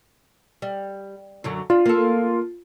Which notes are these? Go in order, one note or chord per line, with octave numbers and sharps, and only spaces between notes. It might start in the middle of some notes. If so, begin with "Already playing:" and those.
G3
F#2 D3 F#3
D4 F4
A#3 A4